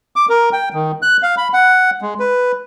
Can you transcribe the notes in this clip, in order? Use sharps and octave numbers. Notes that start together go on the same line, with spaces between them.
D6
A#4
G5
D#3
F#6
F5
B5
F#5
G#3
B4